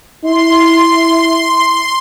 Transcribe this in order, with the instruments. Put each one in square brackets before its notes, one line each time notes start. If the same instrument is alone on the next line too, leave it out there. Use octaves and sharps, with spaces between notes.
[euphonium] E4 [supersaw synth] C6